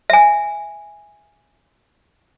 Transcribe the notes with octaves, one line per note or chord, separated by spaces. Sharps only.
E5 G#5